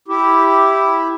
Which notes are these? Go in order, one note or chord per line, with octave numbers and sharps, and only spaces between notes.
E4 G4